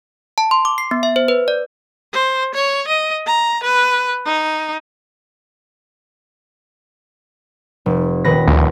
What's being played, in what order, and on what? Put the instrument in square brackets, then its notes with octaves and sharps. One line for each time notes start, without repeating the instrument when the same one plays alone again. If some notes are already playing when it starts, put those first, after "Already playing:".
[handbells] A5
C6
D6
C7
B3
E5
C5
B4
D5
[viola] C5
C#5
D#5
A#5
B4
D#4
[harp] F1
D#1 B4 A#6
[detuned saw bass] D2